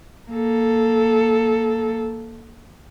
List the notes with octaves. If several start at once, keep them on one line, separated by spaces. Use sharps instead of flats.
A#3 A4